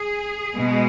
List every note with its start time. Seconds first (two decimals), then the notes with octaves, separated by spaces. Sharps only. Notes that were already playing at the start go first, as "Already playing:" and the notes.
Already playing: G#4
0.58 B2 G#3